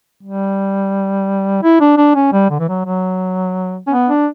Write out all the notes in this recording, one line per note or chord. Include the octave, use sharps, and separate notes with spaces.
G3
E4
D4
D4
C#4
G3
D3
E3
F#3
F#3
C#4
B3
D4